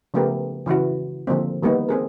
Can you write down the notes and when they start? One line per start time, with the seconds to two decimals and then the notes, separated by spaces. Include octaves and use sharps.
0.14 C#3 F3 A3 B3 G4 A#4
0.66 C#3 E3 E4 F#4
1.27 D3 F3 A#3 C4
1.62 D#3 G3 A#3 B3 D#4
1.89 C4 G#4 A#4